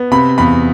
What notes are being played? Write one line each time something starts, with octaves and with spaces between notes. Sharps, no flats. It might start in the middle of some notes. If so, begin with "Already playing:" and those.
Already playing: B3
C3 B5
E2 B5